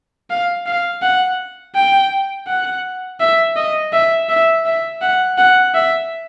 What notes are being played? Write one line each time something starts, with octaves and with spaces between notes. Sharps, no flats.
F5
F5
F#5
G5
F#5
E5
D#5
E5
E5
E5
F#5
F#5
E5